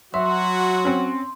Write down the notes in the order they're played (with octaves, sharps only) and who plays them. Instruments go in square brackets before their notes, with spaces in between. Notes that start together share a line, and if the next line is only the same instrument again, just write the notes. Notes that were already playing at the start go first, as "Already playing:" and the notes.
[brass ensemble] F#3 F#4 [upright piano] E5 [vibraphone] C6
[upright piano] C4 C#4